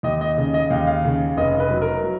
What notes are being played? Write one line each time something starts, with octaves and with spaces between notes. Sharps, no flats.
D#2 D#5
D#5
C#3
D#5
D#2 F5
F5
C#3
F1 D#5
B4
F#3
A#4
F#3